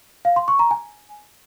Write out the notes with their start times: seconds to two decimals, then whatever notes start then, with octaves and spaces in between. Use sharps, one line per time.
0.25 F5
0.36 C6
0.48 C#6
0.59 A#5
0.71 G#5